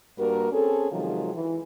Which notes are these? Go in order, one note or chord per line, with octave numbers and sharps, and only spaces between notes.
G2 A#3 F#4 A#4
C4 C#4 G#4 A4
C3 D#3 F3 F#3 G#3 F4
E3